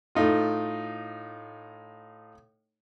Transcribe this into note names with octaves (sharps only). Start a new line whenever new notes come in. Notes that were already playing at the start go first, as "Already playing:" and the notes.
A2 A3 D#4 F4